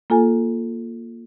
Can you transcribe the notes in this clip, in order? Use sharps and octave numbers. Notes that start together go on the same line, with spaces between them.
A#3 F4 A4 G#5